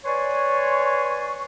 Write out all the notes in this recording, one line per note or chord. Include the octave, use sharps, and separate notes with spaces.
B4 C#5 D5 G#5 C6 C#6